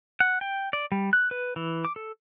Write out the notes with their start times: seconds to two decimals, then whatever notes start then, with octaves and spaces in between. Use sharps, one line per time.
0.20 F#5
0.41 G5
0.73 D5
0.92 G3
1.13 F#6
1.31 B4
1.56 E3
1.85 D6
1.96 A4